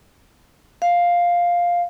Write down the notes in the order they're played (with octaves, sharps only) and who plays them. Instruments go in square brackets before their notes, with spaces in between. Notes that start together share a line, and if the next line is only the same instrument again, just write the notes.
[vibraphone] F5